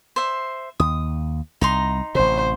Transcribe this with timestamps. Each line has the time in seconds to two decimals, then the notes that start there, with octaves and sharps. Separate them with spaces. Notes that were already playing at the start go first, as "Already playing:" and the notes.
0.16 C5 E5
0.80 D#2 D#6
1.61 C2 D#4 A#5 C6
2.15 A1 C3 C5